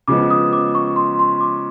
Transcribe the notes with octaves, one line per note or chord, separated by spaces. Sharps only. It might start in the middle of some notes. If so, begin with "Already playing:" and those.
C#3 F3 G#3 B3 D6
D#6
D6
C#6
C6
C6
D6